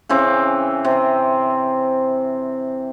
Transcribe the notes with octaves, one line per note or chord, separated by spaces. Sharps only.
C#3 E3 C4 D6
C3